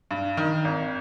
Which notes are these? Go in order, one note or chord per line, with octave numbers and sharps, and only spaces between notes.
G2
D#3
G#1